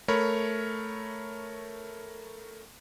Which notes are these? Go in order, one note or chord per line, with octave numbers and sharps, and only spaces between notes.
A3 A#4 C#5 B5